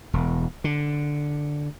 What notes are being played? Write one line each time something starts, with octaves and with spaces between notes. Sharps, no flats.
E1
D3